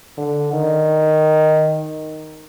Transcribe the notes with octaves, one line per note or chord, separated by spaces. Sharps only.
D3
D#3